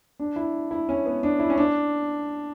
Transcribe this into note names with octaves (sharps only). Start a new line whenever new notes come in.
D4
E4
E4
C#4
B3
D4
E4
C#4
D4